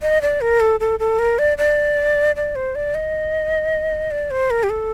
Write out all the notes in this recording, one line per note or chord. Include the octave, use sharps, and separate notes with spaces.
D#5
D5
A#4
A4
A4
A4
A#4
D5
D5
D5
C5
D5
D#5
D5
C5
A#4
G4
A4